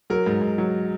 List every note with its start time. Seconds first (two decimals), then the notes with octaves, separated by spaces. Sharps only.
0.10 F#3 A#4
0.26 G#2
0.41 G#2
0.58 F#3